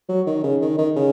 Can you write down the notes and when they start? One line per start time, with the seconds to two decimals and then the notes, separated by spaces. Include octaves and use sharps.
0.09 F#3
0.26 D#3
0.43 C#3
0.61 D#3
0.78 D#3
0.96 C#3